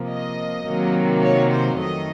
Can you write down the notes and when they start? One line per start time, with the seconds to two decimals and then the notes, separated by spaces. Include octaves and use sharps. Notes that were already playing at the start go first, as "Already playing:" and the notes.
Already playing: C3 F3 A#3
0.10 D#5
0.66 C3 D#3 F#3 A#3
1.23 C#5
1.51 C5
1.79 F2 D#3 A3 D#5